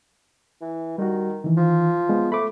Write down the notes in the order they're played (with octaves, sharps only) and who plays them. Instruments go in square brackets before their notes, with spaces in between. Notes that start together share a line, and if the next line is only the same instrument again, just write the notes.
[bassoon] E3
[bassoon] D#3 [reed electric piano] G3 F#4
[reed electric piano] D#3 E3
[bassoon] F3
[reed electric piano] G#3 B3
[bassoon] A3 [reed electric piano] B5 D6